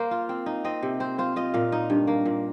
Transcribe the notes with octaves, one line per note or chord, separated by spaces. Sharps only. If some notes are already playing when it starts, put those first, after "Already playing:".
Already playing: A#3 C5
F4
C4
D#4
C4 D#5
C3
C4 C5
F4 C5
F4 D#5
A#2 F5
D#4
G2
A#3
A#2